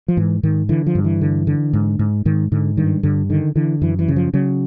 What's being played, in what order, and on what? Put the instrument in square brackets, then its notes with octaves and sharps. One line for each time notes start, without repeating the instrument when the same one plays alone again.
[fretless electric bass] F3
G#2 E3
G#2 D#3
D3 E3
F3
G2
E3
D3
D3
G#2
G#2
G#2 D#3
G#2 D3
G2 D#3
G2 D3
D3 D#3
D3 E3
F#2 E3
E3
C#3
F3
C#3 F#3